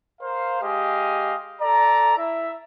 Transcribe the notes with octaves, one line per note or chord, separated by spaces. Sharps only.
A#4 C5 F5
G#3 G4 D#5 F5 G#5
A4 D5 A#5
E4 E5